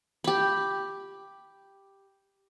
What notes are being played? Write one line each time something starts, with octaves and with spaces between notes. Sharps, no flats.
G4 B5